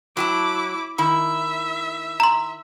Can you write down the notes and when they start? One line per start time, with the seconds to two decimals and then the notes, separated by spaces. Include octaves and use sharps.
0.17 F#3 E4 G#5 A5 D6
0.98 D#3 E4 E5
2.20 A#5 C6